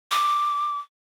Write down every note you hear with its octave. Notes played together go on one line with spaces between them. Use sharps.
D6